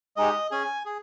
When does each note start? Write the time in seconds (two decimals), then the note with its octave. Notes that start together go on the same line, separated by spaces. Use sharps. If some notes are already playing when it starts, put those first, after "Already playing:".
0.16 G#3 D#4 G4 D#5
0.51 C#4 G#4 G#5
0.86 G#4